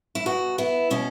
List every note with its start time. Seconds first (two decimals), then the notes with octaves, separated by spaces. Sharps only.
0.15 E4
0.26 B2 F#4
0.58 B3 E4
0.90 B2 C#4